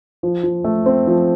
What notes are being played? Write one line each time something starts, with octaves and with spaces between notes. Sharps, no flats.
F3
F3
A3
C4
F3